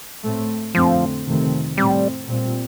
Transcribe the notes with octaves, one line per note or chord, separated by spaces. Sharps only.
A2 A3 C4
F2 D3 F3 A3 C4
F2 C3 D#3 A3 C4
A2 G3 A3 C4
A#2 G3 C4